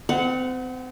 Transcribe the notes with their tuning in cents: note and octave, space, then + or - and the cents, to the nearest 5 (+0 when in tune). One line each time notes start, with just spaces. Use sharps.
C4 -35 F#5 +0